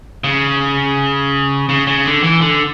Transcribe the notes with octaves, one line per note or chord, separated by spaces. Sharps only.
C#3
C#3
C#3
D3
E3
D3